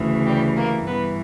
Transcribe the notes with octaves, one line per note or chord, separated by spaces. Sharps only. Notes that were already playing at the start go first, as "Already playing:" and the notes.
Already playing: D2 C#3 E3
G3 G4
A#3 A#4
G2 E3 B3 B4